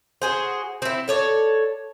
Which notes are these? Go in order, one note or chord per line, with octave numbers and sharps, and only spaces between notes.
F#4 G#4 C5
C4 E4
A4 C#5 D5